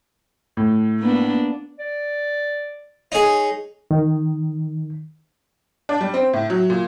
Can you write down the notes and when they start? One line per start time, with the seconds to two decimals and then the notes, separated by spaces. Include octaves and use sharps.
0.57 A2
1.00 A#3 B3 D4
1.79 D5
3.12 D#4 G#4 C#5
3.91 D#3
5.89 D4
6.01 G3
6.14 C4
6.33 A2
6.50 F#3
6.70 A#2